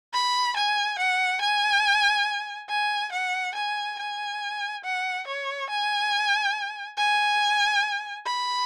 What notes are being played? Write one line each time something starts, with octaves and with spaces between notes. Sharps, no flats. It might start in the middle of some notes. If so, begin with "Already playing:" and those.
B5
G#5
F#5
G#5
G#5
F#5
G#5
G#5
F#5
C#5
G#5
G#5
B5